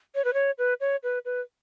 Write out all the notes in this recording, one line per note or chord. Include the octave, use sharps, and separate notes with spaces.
C#5
B4
C#5
B4
C#5
B4
B4